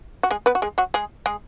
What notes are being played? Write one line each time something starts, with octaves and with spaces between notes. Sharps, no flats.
F#4
G#3 G#4
B3 B4
F#4
G#3 G#4
F#3 F#4
G#3 G#4
G#3 G#4